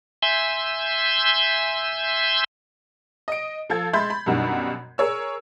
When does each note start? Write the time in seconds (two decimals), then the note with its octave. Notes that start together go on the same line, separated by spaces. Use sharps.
0.23 E5 G#5 C6 E6 G6
3.28 D#5 D7
3.70 F3 A4 F5 G#6
3.93 G#3 E5 B5 C6 G6 A6
4.10 B5
4.26 F#2 B2 D#3 G3 D4 F#4
4.98 G#4 A#4 C#5 E6